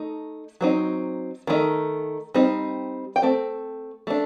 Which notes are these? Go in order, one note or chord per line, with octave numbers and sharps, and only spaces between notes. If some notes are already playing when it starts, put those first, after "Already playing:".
Already playing: A3 D#4
F#3 C4 D#4
D#3 A3 D#4
G3 C4 D#4
G5
A3 C4
A3 D4